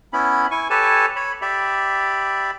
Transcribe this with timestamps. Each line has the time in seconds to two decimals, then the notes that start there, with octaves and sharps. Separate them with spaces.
0.13 B3 C#4 E4 B5
0.51 E4 G#5 C#6
0.70 G4 A4 B4 C#5 G#5 A5
1.16 C#5 B5
1.42 G4 D5 E5 B5